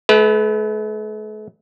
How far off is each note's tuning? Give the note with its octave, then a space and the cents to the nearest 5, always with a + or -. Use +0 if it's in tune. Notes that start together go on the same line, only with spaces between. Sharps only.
A3 -45 B4 +5